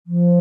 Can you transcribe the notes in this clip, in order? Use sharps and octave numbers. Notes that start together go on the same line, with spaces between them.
F3